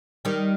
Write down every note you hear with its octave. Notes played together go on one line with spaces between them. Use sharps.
D#3 G3